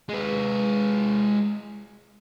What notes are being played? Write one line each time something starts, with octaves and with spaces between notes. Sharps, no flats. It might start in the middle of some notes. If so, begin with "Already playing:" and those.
G#3 B4